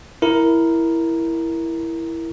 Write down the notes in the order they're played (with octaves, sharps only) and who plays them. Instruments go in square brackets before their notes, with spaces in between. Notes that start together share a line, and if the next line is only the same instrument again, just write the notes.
[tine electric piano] E4 A#4